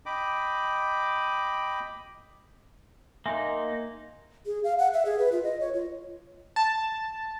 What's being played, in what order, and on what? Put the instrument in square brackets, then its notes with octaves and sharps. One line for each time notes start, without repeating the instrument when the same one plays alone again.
[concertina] D#5 G5 B5 D6
[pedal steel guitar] A#3 D#4 [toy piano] E5 G#5 C6
[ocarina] G#4
F5
F#5
E5
G#4
B4
F4
D#5
C#5
F4
[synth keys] A5